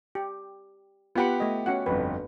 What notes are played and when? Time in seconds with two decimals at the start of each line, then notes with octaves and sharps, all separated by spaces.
0.15 G4
1.16 B3 F4 G4 F#5 B5
1.40 A3 D#5
1.66 C#4 F#4 F#5
1.86 G1 F2 B4